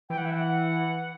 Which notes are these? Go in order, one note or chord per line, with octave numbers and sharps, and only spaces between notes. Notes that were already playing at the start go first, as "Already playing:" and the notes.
E3 G5
F#5
E5
F#5